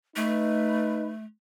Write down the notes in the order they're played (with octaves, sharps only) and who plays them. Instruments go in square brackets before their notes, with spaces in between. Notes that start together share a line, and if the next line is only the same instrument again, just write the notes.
[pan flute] A3 [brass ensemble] D#4 B4